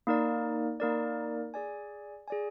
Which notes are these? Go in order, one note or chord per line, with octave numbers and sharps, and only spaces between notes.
A#3 D#4 A#4 D5
A#3 D#4 A#4 D5
G#4 D5 G#5
G#4 D5 G#5